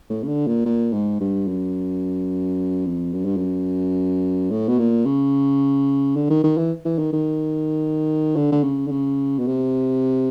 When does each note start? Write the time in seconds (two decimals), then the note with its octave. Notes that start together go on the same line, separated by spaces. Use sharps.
0.10 A2
0.24 C#3
0.28 D3
0.47 A#2
0.66 A#2
0.93 G#2
1.21 G2
1.48 F#2
2.86 F2
3.13 F#2
3.25 G2
3.37 F#2
4.51 A2
4.68 B2
4.79 A#2
5.06 C#3
6.16 D3
6.30 D#3
6.44 D#3
6.58 E3
6.85 E3
6.99 D#3
7.13 D#3
8.36 D3
8.52 D3
8.64 C#3
8.87 D3
8.91 C#3
9.39 B2
9.47 C3